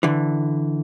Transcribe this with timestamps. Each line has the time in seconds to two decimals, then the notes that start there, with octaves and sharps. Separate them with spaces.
0.03 D3 E3